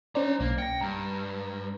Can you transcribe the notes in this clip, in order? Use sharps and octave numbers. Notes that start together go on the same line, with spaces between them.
C#4 D4 C5 D5 A#5
B1 A#3
G5 A#6 C#7
G2 A#5